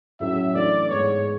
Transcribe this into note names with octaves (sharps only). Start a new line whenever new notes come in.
A2 F#3 C#4 F#4 E5
E3 A3 D4 D5
G#2 G#3 B3 C#5